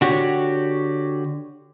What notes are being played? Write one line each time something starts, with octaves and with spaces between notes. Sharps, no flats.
D3 F#4 G4 C#5